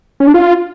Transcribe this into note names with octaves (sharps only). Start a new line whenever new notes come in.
C#4
D4
F4